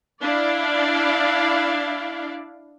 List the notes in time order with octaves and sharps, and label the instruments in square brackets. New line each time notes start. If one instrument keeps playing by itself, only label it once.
[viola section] D4 E4 D5 F5